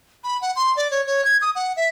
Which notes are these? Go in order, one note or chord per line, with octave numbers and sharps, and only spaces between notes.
B5
F#5
C6
D5
C#5
C#5
G#6
D#6
F#5
E5